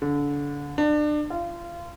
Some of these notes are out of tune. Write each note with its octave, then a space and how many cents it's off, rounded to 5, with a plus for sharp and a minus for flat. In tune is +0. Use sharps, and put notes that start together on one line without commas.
D3 -30
D4 +30
F4 -25